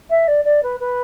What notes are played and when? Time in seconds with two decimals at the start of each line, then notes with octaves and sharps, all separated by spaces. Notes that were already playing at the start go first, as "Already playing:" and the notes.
0.10 E5
0.28 D5
0.45 D5
0.63 B4
0.80 B4